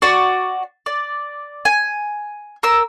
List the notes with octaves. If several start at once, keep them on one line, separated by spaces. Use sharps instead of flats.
F#4 D5
D5
G#5
A#4 E6